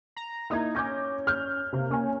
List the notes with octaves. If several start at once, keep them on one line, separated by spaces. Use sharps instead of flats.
A#5
A#3 D#4 E4 G#6
C#4 D6 G6 A#6
F6 G6
C3 A#3
A#3 C#4 G#5